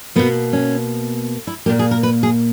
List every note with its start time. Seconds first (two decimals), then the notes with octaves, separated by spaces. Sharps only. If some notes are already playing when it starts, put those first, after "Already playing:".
0.16 B2 A#3 B3
0.53 C#4
1.47 E4
1.66 A#2 A#3 G4
1.79 G#4
1.91 A#4
2.03 B4
2.23 G#4